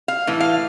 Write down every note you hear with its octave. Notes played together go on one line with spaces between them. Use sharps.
F5
A2 E3
F5